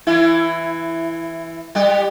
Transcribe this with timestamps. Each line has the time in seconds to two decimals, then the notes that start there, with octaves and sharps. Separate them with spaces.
0.07 E3 E4
1.75 G3 G4